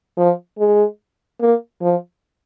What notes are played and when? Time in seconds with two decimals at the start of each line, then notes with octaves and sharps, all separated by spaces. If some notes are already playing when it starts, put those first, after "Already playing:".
0.18 F3
0.59 G#3
1.41 A#3
1.82 F3